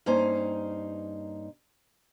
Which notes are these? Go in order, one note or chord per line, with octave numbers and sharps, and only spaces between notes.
G2 A#3 C#4 D#4 C5